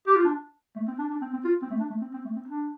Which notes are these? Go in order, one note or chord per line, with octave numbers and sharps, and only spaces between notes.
G4
F4
D4
A3
C4
D4
D4
C4
C4
F4
C4
A3
D4
A3
C4
C4
A3
C4
D4